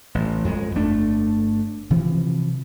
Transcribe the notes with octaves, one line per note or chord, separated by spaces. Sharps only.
A1
F2 G#3
G1 A3 D4
C3 E3 F3